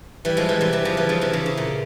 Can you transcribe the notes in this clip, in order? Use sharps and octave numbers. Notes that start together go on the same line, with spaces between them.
E3 G3
F3 G#3
E3 G3
C3 E3
C3 E3
C#3 F3
E3 G3
C#3 F3
C3 E3
C#3
C#3
A#2